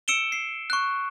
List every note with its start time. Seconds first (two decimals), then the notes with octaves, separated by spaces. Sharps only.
0.08 E6 C#7 D7 E7 G7
0.32 C7
0.70 C#6 F#6